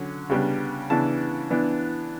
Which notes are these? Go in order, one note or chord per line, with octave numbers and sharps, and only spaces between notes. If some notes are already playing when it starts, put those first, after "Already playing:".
Already playing: D3 F#3 C#4
C#3 G3 B3 D4
C#3 E3 B3 D4 A5
E3 B3 D4